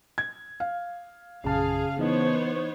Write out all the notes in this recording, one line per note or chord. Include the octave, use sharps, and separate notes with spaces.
G#6
F5
A#1 F#2 C#3 G#4 F5 A5
E3 B3 D#4 C5 C#5 D#5